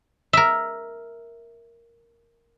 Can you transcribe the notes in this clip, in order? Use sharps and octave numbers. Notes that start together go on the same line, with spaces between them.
A#4 E5